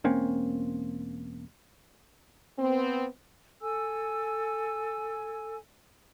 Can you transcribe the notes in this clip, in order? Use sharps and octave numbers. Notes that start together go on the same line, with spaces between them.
E1 A#3 C4 C#4
B3 C4
A4 G#5 E6